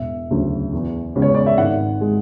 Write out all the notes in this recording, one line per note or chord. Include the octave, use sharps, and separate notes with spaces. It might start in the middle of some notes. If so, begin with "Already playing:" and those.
Already playing: E1 E5
D2 C#3 F#3
E2
C#3 G#3 B3
C#5
D5
E5
G#1 F#5
G#3